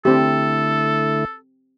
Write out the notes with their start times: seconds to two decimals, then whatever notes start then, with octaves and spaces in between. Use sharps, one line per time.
0.05 D3 A3 C4 E4 G4 A4